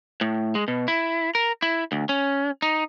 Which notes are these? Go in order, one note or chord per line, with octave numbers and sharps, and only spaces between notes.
A2
G#3
B2
E4
A#4
E4
D2
C#4
D#4